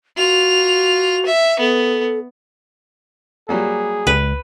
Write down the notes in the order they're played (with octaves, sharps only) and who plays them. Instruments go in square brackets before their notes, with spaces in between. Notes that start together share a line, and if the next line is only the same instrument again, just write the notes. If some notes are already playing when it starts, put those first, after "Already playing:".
[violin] F4 F7 [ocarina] F#4
[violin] E5
[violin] B3 [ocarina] A4
[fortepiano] F#3 G3 A#3 [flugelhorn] G#4
[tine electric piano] C#2 [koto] B4